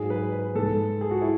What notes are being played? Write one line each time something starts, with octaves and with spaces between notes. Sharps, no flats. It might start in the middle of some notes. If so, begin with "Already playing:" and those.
Already playing: G#2 F#3 G#4
B4
B4
G#2 G#3 A4
G#4
F#4
E4